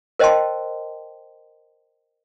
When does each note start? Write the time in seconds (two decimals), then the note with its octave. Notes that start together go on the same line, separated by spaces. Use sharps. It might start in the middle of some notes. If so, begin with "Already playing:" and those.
0.19 A#4 C5 D#5 G5 A5 C6